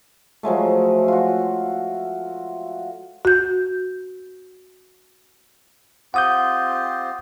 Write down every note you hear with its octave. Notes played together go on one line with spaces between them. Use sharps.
F3 F#3 G#3 A3
F4 F#4
F#4 G6
C4 F4 G4 F#5 D#6 G6